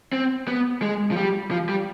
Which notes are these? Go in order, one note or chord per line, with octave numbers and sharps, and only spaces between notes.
C4
B3
G#3
F3
G3
F3
G3